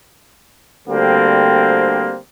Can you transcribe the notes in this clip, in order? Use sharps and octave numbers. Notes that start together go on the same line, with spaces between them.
D2 D3 G3 A#3 C4